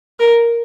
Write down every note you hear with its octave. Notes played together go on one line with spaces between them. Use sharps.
A#4